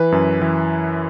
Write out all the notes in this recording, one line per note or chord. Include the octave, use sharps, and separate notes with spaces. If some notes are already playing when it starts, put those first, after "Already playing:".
Already playing: E3 B4
F#2
E3